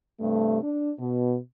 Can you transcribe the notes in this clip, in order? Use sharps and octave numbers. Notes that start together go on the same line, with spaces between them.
G2 C3 A3
D4
B2